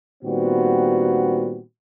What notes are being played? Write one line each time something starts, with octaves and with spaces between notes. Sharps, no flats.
A#2 D#3 G3 B3 C4 F#4